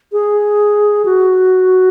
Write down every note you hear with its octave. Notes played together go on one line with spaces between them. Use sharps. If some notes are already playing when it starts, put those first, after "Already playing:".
G#4
F#4